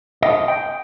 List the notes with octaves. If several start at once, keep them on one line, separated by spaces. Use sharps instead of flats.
D#5
G5